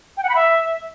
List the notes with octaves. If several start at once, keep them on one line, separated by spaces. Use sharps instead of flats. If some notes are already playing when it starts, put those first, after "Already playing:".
G5
F#5
B5
E5